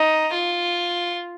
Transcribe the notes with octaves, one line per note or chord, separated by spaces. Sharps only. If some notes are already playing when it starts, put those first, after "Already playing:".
Already playing: D#4
F4